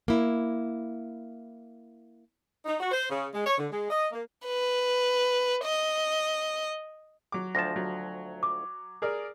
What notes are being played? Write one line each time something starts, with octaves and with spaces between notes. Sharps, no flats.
A#3 E4
D#4
F#4
C5
C#3
G#3
C#5
D3
G#3
D#5
A#3
B4
D#5
F#3 D6
D2 F3 A5 A#6
F#3
D6
G#4 A#4 D5